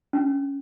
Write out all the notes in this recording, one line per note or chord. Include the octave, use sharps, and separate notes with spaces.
C#4